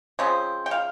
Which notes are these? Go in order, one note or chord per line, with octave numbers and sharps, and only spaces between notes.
C#3 F3 G#3 C4
G5
F5